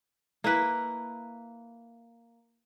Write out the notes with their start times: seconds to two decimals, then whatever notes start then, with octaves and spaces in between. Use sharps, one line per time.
0.44 A#3 E4 B4